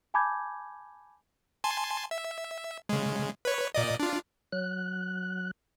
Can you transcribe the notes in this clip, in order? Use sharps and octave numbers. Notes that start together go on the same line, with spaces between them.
G#5 A5 B5 D6 G6 G#6
G#5 A5 C6
E5
C#3 G#3
B4 C#5
A#2 D5 D#5
D4 F4
F#3 F#6